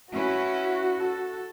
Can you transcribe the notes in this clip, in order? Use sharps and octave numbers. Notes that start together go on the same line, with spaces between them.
C#4 E4 F#4 B4
A4